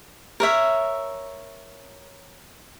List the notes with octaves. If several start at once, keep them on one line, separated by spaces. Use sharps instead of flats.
A#4 C#5 E5